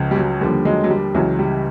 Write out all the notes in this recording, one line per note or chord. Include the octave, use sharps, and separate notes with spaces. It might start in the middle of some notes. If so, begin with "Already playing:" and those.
Already playing: C#2 C#3 F3
G3
F#3
D#2 D3 F3 G3
F#3 G#3
F#3
G3
C#2 C#3 E3 F#3
G3